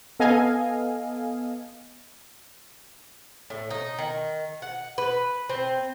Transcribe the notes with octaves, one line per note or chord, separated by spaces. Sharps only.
B3 A4 D#5 F5 G#5
A2
D#4
D#3
F#5
B4
C4